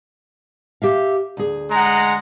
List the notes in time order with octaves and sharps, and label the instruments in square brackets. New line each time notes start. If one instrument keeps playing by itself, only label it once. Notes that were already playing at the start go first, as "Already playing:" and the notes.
[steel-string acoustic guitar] G4 E5 F5
D2 G#4
[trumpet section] G#3 F#5 A#5